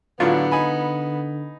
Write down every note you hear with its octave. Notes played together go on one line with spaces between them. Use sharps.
A2 D3 F#3 B3 D4 F4
D#4 G#5 B5